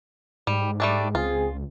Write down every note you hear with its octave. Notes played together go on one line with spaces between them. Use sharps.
G#2 G3
G3 A3 D4
C#2 C4 F4 G#4